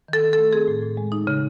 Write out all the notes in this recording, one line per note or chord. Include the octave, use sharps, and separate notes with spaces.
D#3 A4
D#3
A3 A4
C4 G#4
A2
A2
G#3
D#4
C#3